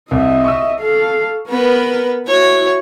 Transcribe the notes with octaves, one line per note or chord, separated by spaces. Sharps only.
C2 D#5 E5
C#6 E6
A4 F5
B3 A#4 B4
E4 F#4 C#5